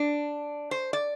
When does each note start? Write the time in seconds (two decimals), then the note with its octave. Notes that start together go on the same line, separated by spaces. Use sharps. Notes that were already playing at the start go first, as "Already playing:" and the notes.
Already playing: D4
0.71 C5
0.93 D5